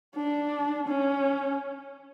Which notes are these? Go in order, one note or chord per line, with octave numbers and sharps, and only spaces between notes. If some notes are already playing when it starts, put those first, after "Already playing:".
D4
C#4